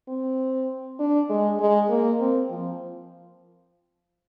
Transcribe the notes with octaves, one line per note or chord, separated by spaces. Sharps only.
C4
D4
G#3
G#3
A#3
C4
F3